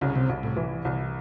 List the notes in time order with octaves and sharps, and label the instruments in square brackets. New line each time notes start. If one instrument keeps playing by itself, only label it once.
[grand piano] C2 [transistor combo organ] C#3
[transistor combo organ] C3
[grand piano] C2
[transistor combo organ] A2
[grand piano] E3
C2